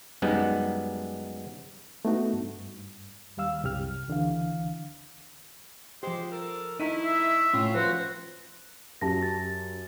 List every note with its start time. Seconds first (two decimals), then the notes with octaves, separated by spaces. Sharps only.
0.22 F#2 G3 G#3 B3 D#4
2.05 A3 B3 D#4 F#4
2.33 G2
3.37 D#2 G3 F5 E6
3.64 C2 F#2 G4 F6
4.08 C#2 D3 E3 F5
6.03 F3 G#3 G4 C5
6.32 A4 A#4
6.80 A3 D#4 E4 A#5 B6 D#7
7.05 E5
7.53 A2 C#4 F4
7.75 F3 F#3 F#4 B4 C5
9.01 F#2 G4 A5 A#6
9.23 A6